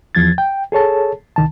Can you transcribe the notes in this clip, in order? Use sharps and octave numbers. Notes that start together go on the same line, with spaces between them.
E2 F3 G#6 A6
G5
G#4 A4 C#5 A5
C2 D#3 A5